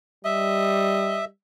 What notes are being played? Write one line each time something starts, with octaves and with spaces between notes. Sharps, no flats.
G3 D#5 E5